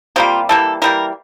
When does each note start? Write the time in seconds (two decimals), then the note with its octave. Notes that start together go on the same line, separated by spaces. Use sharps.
0.16 C3 G3 A#3 F4
0.49 E3 G3 A#3 A4
0.82 E3 G3 A#3 A#4